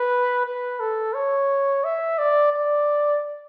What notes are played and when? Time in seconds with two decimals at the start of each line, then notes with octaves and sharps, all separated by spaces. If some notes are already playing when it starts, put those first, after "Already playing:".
Already playing: B4
0.45 B4
0.80 A4
1.14 C#5
1.84 E5
2.18 D5
2.52 D5